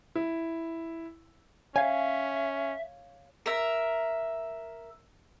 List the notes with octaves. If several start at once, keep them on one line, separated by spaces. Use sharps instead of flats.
E4
C#4 C#5 E5 F5 G#5
A#4 E5